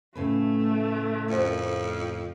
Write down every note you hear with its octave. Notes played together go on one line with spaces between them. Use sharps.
A2 C#3 A3 B4
F2 A#4 C5 D5